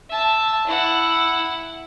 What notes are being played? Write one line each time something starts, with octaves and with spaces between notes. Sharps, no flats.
E5 A5
E4 F#5